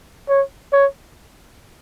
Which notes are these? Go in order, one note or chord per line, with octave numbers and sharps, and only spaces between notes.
C#5
C#5